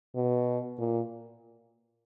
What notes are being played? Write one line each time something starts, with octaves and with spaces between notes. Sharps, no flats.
B2
A#2